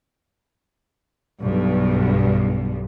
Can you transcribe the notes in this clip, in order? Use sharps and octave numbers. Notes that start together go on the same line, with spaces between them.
B1 G2